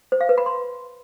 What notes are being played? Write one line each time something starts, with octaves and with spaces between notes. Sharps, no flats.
C5
F5
B4
B5
C6